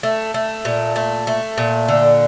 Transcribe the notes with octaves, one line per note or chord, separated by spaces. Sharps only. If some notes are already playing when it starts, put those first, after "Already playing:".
A3
A3
A#2
A3
A3
A#2
D3